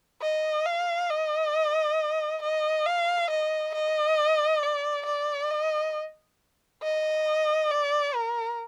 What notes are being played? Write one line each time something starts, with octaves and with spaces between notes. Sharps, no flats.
D#5
F5
D#5
D#5
F5
D#5
D#5
D5
D5
D#5
D#5
D5
A#4